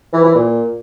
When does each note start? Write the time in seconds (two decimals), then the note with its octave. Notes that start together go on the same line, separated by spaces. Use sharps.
0.13 E3
0.24 E3
0.35 A#2